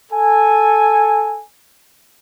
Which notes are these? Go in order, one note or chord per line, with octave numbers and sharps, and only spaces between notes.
A4 G#5